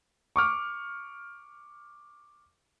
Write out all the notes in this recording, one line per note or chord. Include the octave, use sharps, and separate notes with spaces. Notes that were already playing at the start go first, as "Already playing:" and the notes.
C#6 D6 F6